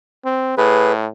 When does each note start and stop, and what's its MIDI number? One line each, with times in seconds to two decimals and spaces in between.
0.25 0.53 60
0.58 1.07 45
0.58 0.92 68
0.58 0.92 71